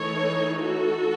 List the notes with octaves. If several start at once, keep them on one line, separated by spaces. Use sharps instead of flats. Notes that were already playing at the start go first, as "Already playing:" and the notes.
Already playing: E3 A3 D#4 A4 C#5
F#4 A4